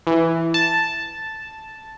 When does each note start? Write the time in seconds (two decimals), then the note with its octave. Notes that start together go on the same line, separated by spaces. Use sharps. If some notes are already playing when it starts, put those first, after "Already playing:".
0.07 E3
0.54 A5